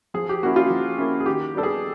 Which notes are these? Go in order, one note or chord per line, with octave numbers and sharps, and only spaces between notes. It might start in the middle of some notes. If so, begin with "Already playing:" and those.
F3 G#4
G4
A#3 C#4 E4 F#4
F4
F3
A#3 C#4 E4
G#4
D#3 G4
G3 B3 D4 A4
G#4